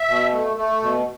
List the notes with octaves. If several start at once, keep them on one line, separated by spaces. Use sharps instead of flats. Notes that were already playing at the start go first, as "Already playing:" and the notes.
Already playing: E5
B2
A3
A3
B2